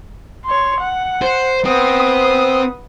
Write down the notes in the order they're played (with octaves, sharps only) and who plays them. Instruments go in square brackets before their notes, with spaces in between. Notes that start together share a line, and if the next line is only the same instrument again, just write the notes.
[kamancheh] C#5 C6
F#5
[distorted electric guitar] C5
[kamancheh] B3 D#6 [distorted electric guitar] C4